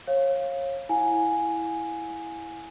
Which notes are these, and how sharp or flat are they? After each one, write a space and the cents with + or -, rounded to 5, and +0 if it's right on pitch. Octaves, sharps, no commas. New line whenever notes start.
C#5 -30 F5 +0
E4 +0 F5 +45 G#5 +0